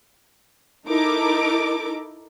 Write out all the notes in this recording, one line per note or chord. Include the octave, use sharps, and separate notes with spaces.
D#4 E4 A4 A#4 D6